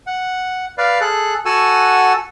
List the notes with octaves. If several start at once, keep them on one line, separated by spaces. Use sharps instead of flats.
F#5
B4 D5 F5
G#4 A4 F#6
F#4 A4 F#5 G#5 E6